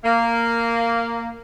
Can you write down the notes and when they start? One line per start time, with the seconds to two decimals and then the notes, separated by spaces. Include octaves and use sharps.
0.05 A#3